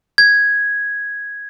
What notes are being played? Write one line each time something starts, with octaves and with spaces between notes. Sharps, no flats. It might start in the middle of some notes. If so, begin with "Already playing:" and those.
G#6